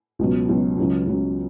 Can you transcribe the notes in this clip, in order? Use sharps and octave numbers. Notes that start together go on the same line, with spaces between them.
C#2 B2 F#3
C#2 B2 F#3
C#2 C#3 F#3
C#2 C#3 F#3